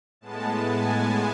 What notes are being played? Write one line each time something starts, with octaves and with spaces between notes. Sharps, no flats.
A2 G#3 B3 A5
G#5